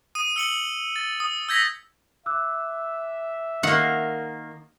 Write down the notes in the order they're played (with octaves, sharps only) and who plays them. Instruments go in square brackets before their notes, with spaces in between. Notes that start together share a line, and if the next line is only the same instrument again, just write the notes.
[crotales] D#6 D#7
E6 C#7 F#7 G7
A6
D#6
E6 G6 G#6 A#6 B6
[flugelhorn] E5 [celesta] D6 E6 F#6
[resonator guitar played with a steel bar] D#3 A#3 [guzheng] F#5